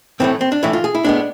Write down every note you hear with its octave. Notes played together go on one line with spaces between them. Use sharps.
A2 E3 A3 C4
C4
D4
A2 E3 A3 E4
F4
G#4
E4
A2 G#3 B3 D4